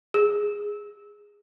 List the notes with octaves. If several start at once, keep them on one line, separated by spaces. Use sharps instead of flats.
G#4